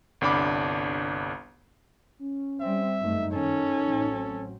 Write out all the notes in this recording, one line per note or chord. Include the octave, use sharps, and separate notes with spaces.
G1 C2 D4 B5 D6
C#4
G3 C4 E5
F#1 G2 A3 D#4
D#3 C#4 A4
A1 F#3 C4